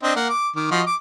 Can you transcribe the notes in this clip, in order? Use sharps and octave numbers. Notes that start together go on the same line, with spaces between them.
C4 D4 D#5
A#3 F#5
D6
D#3 D6
F3 F#4 D#5
D6